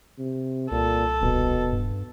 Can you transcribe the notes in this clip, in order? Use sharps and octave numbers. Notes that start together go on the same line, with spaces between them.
C3
C2 A#2 A4
D#1 B2
G2